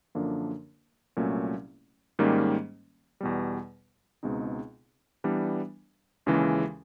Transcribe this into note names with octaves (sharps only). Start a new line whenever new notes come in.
F#2 D3 F3 A#3 D4
C2 A#2 F#3 A3 C#4
G#2 D#3 G3 A#3 C#4
E2 B2 G3
C#2 B2 G#3 C4 D#4
E3 G3 B3 D4
D#2 C#3 E3 G#3 C#4